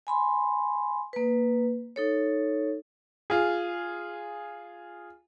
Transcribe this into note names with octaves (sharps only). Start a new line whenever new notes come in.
G#5 B5 C6
A#3 B4
D#4 A4 C#5
F4 G#4